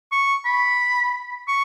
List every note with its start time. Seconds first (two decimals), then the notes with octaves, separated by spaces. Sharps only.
0.11 C#6
0.45 B5
1.48 C#6